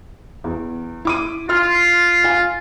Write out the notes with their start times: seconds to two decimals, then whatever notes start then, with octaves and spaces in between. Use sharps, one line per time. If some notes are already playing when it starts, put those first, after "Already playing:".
0.44 E2
1.05 E4 D6 D#7
1.49 F4 C6 F6
2.24 F5 G#5